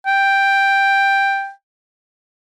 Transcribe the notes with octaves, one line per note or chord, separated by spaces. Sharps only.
G5